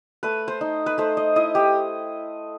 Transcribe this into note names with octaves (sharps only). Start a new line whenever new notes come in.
A3 B4
C5
D#4
B4
A3 C5
D#5
E4 D#5
G4